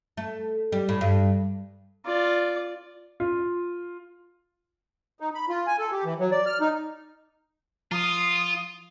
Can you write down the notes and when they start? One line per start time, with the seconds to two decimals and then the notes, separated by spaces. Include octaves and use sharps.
0.17 A3
0.72 G3
0.89 A2
1.01 G2
2.06 F4 D5
3.20 F4
5.20 D#4
5.35 B5
5.49 F4
5.67 G#5
5.79 A4
5.92 G4
6.05 E3
6.20 F#3
6.32 D5
6.46 F6
6.61 D#4
7.91 F3 F4 D#6